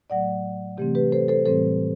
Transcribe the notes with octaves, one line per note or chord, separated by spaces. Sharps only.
A2 F#3 A3 D5 F#5
C3 E3 A3 C4 G4
G4 B4
A4 C5
A4 C5
A2 E3 G3 C4 A4 C5